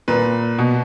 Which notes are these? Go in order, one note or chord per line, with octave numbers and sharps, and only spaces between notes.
A#2 B4
B2